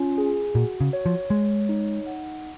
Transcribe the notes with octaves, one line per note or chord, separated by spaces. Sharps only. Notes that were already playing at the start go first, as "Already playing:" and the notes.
Already playing: C#4 F4
G#4
A#2 F#4
C#3
C#5
F3
G#3 C#5
D#4
F#5